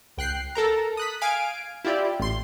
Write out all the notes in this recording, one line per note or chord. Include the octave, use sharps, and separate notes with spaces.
C#2 G5 F#6 C7
A4 A#4 A#5
D#6 F#6 B6
F5 G#5 D7
E4 F4 G4 D5
A1 C6